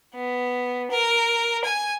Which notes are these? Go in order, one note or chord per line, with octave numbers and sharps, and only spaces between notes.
B3
A#4
G#5